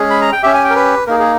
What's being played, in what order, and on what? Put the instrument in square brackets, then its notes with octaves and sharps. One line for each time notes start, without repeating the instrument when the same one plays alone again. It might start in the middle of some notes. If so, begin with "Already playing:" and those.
Already playing: [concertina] G#3 C#4 G#4
B5
A#5
G5
C#4 G4 E5
G#5
G5
A#4
B4
A#3 D#4 G#4 A#4
G#4